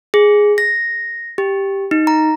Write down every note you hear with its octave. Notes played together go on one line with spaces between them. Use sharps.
G#4
A#6
G4
D#4
A#5